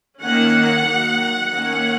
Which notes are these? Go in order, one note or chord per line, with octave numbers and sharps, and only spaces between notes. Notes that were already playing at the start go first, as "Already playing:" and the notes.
D#3 A#3 C#4 F#5
D#3 F#3 A#3
D#3 A#3 C#4 F#5